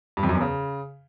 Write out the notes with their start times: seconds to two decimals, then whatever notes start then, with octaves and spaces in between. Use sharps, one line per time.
0.17 G2
0.23 F2
0.29 F#2
0.35 E2
0.41 C#3